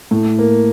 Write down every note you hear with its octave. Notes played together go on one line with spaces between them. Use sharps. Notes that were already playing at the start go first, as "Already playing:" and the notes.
A2
A#3